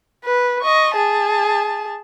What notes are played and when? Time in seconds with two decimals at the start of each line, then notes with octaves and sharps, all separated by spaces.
0.24 B4
0.62 D#5 C#6
0.95 G#4 A5